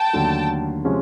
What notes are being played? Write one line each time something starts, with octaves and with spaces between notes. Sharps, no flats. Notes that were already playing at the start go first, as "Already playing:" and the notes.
Already playing: G5 A5
D#2 D3 F#3 A3
C3 F3 G#3 C#4